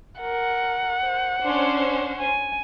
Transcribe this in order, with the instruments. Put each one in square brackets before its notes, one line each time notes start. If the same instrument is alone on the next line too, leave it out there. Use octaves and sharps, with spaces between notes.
[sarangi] A#4 [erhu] F#5
[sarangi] C5
[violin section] C#4 C5 [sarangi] D4
[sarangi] G#5